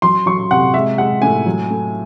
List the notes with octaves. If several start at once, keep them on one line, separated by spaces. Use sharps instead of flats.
F#3 C6
F#3 C#6
C3 F#5
G#3 E5
G#3 F#5
A2 G#5
F#3
A3